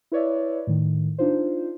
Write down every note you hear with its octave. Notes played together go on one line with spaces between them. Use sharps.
E4 B4 C#5 D5 E5
A2 D#3
D4 D#4 F4 C5